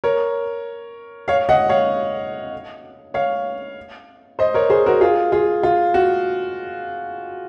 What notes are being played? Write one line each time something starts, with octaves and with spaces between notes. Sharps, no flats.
A#4 C#5
C#5 F5
D#5 F#5
C#5 F5
C#5 F5
C5 D#5
A#4 C#5
G#4 C5
F#4 A#4
F4 G#4
F4 G#4
F4
F#4